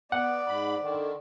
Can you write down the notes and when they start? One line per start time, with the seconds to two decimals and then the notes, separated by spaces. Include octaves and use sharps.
0.12 B3 D5 F#5
0.47 G#2 B5
0.82 D3 D#3